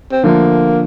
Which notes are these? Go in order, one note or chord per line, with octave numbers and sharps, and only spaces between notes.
C4
D3 F3 A3 A#3